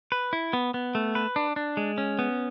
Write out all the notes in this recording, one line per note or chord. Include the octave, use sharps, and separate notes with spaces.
B4
E4
B3
B3
A3
B4
D4
D4
G#3
C#4
B3